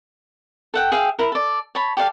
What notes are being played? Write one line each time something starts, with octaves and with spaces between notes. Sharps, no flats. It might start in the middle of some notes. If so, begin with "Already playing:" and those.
A4 F#5 G5
G#4 E5 F5 G5
E4 A#4
A4 D5
C#5 A5 B5
G4 A4 D5 F5